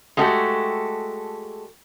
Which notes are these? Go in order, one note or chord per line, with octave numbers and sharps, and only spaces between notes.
G#3 A3 F#4 G4 A4